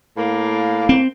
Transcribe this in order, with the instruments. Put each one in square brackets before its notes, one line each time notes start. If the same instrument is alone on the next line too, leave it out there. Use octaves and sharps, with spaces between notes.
[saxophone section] A2 A#3
[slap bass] C4